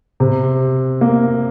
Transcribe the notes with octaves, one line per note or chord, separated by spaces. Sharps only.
C3
A#3